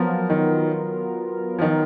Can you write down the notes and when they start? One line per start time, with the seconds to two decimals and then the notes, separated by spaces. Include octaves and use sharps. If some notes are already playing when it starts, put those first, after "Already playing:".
Already playing: F3 F#3 B3 F4 A#4
0.30 D#3
1.59 F3
1.61 D#3